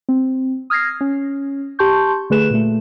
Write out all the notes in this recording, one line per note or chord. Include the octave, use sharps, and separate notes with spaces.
C4
D#6 F6 G#6 A#6 C7
C#4
G4 A5 C6 C#6 G6
D3 A3 G#4 B4 F#6 E7
A#2 A3